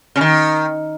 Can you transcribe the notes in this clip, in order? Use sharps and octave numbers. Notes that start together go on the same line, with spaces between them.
C#3
D#3